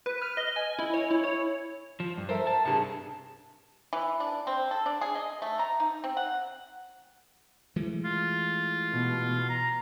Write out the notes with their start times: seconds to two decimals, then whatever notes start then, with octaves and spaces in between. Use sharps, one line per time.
0.06 B4
0.22 F6
0.37 D#5
0.56 G#5
0.79 E4
0.94 C#5
1.11 E4
1.24 C#5
2.00 F3
2.17 G2
2.29 A4 A#4 C5 E5
2.47 A5
2.65 C2 G2 G#4 A5
3.93 E3
4.20 D4
4.47 C4
4.71 A4
4.86 D4
5.01 G#4
5.15 D#5
5.42 A3
5.59 A#5
5.80 D#4
6.04 C4
6.17 F#5
7.76 E3 G#3 A3
8.05 F4
8.91 B2
9.49 A#5